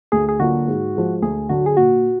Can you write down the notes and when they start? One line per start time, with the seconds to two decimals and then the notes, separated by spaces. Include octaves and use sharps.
0.12 D2 G#4
0.29 G#4
0.40 D3 F#3 A#3 F4 F#4
0.68 G#2
0.96 F3 G#3
1.22 D2 G#4
1.49 D3 F#3 F#4
1.66 G#4
1.77 A#2 F#4